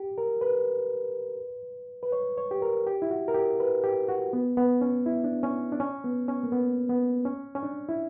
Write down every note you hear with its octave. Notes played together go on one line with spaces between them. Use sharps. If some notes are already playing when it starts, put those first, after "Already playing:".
Already playing: G4
A#4
B4
B4
C#5
C#5
G4
A#4
G4
E4
F#4
A#4
G4
B4
G4
F#4
B3
B3
C#4
E4
D4
C#4
D4
C#4
B3
C#4
A#3
B3
B3
C#4
C#4
D4
E4